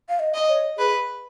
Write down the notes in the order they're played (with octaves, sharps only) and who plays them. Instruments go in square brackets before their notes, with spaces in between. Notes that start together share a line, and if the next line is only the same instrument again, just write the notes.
[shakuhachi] F5
D#5
[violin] D#5
[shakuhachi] C#5
[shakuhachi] G#4 [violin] B4